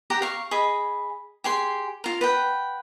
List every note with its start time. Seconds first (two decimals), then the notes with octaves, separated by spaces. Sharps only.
0.10 G4 F#5 A#5
0.22 F5 C#6
0.51 G#4 D#5 B5
1.44 G4 G#4 C6
2.04 F4 A#4
2.21 B4 F#5 G5